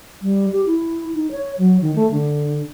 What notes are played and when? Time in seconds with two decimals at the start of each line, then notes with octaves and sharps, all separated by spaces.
0.22 G3
0.53 G4
0.66 E4
1.14 D#4
1.31 C#5
1.58 F#3
1.81 D#3
1.95 A3
2.12 D3